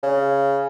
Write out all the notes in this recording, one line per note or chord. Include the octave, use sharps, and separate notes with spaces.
C#3